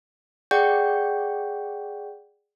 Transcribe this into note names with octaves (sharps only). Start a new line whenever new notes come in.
G#4 D5 F#5 G5 C#6 G6